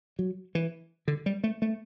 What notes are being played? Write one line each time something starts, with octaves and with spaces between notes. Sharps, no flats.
F#3
E3
D3
G3
A3
A3